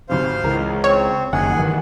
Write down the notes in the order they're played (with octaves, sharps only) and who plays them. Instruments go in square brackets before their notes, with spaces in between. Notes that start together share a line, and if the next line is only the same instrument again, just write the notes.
[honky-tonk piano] G#1 D2 C3 [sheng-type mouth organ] C5 F5 C6
[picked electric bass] C#2 [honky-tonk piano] E3 A#4 A#5
[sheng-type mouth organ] C4 [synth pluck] C#5
[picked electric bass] F#1 D#3 [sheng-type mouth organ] G#4 G#5 [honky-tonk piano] F#5
[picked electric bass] G2 D#3 E3